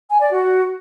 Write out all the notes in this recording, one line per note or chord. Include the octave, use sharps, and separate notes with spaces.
G#5
D5
F#4